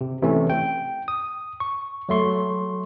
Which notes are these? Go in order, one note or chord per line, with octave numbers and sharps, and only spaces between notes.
C3
C3 E3 A3 C#4
G5
D#6
C#6
F#3 A3 C6 C#6